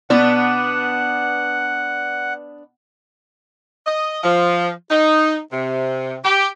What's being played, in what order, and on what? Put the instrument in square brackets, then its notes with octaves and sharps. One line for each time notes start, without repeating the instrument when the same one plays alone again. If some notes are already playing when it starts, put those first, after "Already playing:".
[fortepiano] B2 [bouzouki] B3 D4 [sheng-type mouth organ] F#5
[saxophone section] D#5
F3
D#4
C3
G4